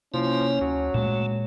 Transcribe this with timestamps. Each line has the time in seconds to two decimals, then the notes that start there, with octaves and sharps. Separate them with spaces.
0.14 C3 F3 A#3 C#4 E4
0.61 D2 F#3
0.94 A#2 G#3 A3